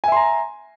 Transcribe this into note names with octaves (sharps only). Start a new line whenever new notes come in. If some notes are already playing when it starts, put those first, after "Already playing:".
E5 G#5 A#5 C6